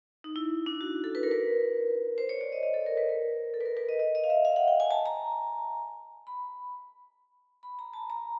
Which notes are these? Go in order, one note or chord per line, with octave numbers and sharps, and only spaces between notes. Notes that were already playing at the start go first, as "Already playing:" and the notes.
D#4
E4
D4
F#4
A4
B4
A#4
B4
C5
C#5
D5
D#5
D#5
A4
A#4
B4
A#4
A4
B4
A#4
B4
D#5
D#5
D#5
F5
E5
F5
F#5
G5
G#5
A5
A#5
B5
B5
A#5
A5
A#5